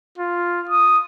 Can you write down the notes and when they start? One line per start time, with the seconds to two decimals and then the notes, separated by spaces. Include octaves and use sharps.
0.18 F4
0.70 D#6